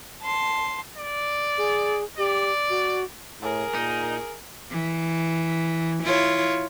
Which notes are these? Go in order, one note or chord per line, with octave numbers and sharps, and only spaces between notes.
A5 C6
D5
G#4
G4 D5
F#4
A2 G#4 A#4
A#2 D#4
E3
E4 F4 C#5